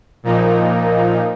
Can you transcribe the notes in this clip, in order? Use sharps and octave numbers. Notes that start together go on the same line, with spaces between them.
A#2 F3 A#3 D#4